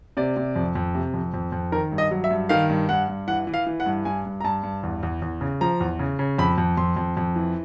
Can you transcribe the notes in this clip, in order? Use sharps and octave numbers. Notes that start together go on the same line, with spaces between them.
C3 D5
C3
F2
F2
C3
F2
F2
F2
D#3 A#4
G2
D#5
F#3
E5
G2
D#3 F5
G2
G2 F#5
G2
E3 F#5
E3
F5
E3
F#5
G2
G2 G#5
G2
A#5
G2 A5
G2
E2
E2
E2
C#3
F3 A#5
E2
C#3
C#3
F2 B5
F2
F2 C6
F2
F2
E3